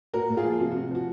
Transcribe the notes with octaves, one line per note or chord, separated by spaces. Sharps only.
A#2 F#4 A#4
A#2
F4 G#4
F3
C3 F#4
C3 F#4
F3 F#4